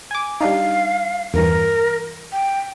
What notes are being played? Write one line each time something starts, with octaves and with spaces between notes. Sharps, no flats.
G#5 D6
G3 D4 D#4 F5
E2 G2 E3 A#4
G5